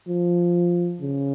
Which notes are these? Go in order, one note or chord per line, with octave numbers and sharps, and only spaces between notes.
F3
C#3